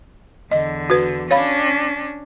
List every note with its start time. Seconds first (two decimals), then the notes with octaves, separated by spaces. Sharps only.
0.51 E2 D3 D#5
0.90 F#4 B4
1.31 C#4 D4 C#5 F5 B5